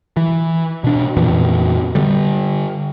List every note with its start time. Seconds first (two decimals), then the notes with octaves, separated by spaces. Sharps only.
0.17 E3
0.84 B2 D4
1.17 F2 A#2 E3
1.95 D3 G3